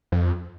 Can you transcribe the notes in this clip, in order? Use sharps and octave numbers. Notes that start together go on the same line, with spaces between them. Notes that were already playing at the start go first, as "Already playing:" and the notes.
F2